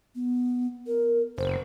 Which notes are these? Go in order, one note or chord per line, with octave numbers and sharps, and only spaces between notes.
B3
A#4
F#1 C5